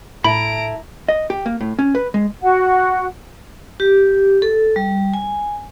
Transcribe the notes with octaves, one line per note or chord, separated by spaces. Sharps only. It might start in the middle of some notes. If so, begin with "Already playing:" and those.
A2 E4 A4 A#5 B5 D7
D#5
G4
A#3
A2
C#4
B4
G#3
F#4 F#5
G4
A4
G3
G#5